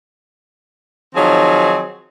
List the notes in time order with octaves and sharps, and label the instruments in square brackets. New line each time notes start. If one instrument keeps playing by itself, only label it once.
[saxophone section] D#3 F3 F#3 C4 D#4 G#4